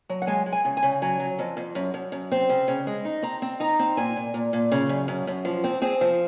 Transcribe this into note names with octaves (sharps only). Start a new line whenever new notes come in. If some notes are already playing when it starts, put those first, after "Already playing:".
F#3
F#5
G#3 G#5
G#3
G#5
C#3
G#5
C#3
F#3 G#5
F#3
F2
F2
F#2
F#2
F#2
C4
C#3
C#3
G#3
D#4
C4 A#5
C4
D#4 A#5
C4
A#2 G#5
A#2
A#2
A#2
C#3
F#2
F#2
F#2
F3
C4
C4 G#4
F3